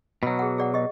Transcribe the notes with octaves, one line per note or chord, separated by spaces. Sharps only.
B2 F#3 B5
G#4 F#5
G#4 D5 F#5
G4 D#5